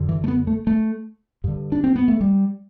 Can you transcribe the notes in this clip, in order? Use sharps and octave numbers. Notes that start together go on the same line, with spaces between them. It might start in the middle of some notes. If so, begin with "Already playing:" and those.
Already playing: F#2 D3
E3
A3
B3
A3
A3
G2 D3
D4
C4
B3
A3
G3